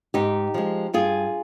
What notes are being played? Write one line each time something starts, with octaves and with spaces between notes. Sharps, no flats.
G#2 D#4 G4
F3 G#3
G2 F4 G#4